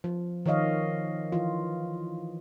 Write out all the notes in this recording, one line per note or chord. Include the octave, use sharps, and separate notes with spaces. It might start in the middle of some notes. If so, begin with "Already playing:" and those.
F3
D#3 F3 C#5 D#5 F5
E3 F3 F4